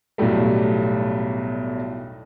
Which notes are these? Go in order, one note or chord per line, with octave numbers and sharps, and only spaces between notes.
B1 E2 A2 F#3 G3 A3